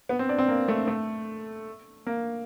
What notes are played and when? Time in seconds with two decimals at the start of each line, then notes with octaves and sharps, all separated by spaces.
0.09 B3
0.19 C4
0.29 D4
0.38 C4
0.48 A#3
0.68 A3
0.88 A3
2.06 A#3